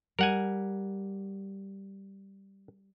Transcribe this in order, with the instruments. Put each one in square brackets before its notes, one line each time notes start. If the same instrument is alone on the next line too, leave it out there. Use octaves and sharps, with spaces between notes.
[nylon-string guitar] G3 [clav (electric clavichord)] A#4 F#5 G#5